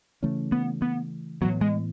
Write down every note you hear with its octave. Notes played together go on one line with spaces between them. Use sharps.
C#3 E3 A3 C#4
B3
B3
A2 E3 F#3 B3
G#3